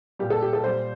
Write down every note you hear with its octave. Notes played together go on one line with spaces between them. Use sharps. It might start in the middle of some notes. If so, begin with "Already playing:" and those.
A#2 G3 G4
A4
G4
A4
A#2 G3 C5